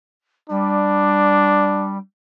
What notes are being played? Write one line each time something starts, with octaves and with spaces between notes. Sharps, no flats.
G3 D4